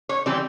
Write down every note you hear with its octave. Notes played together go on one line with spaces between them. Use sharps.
C#5
E3 G3 C4 D5